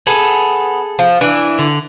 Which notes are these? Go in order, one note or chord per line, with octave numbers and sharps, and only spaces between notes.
B3 G#4 A4
F3
E3 D4
D3